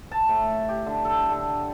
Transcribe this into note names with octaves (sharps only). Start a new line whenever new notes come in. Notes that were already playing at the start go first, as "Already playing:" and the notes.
A5
A2
G4
D3
A4
D3